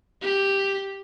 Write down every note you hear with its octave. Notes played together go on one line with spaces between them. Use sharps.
G4